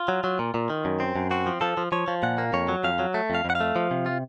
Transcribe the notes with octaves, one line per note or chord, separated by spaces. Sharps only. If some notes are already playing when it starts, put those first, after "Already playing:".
Already playing: F4
F#3
F#3
A#2
A#2
D#3
F#2
C4
F#2
C4 F#4
F3
F3 A4
F3
F3 C#5
F3
A#2 F#5
A#3
F2 C#5
F#3
F2 F5
F#3
A3
F2 F5
F2
F#5
F5
A3
F3
C3
F4